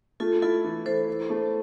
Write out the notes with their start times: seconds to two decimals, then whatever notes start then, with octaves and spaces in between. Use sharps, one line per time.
0.20 A3 F4 A4
0.42 E4 F4 A4
0.64 E3
0.86 E3 A4 C5
1.08 E3
1.30 A3